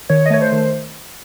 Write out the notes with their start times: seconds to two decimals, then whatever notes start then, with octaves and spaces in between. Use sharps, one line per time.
0.10 D#3 C#5
0.26 D#5
0.30 A3 C#5
0.41 C5
0.52 D#3